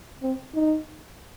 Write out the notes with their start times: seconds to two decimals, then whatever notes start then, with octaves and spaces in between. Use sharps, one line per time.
0.22 C4
0.55 D#4